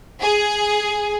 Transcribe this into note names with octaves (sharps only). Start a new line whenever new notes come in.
G#4